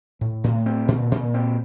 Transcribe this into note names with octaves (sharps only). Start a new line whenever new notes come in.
A2
A2
C4
A#2
A#2
C4